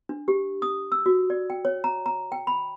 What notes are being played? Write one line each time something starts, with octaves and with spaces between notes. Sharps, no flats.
D4
G4
D#6
E6
F#4
D5
G5
C#5
A#5
A#5
G5
B5